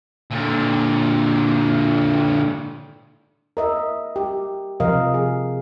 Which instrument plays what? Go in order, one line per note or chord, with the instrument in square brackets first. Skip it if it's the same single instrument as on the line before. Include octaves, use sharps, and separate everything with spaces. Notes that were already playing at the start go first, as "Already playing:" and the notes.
[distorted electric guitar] A#2 D3
[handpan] A#4 D#5 E5
G4
C3 F3 A#4 D#5 F5
G#4